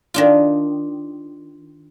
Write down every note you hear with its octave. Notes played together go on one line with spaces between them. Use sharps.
D#3 D4 F4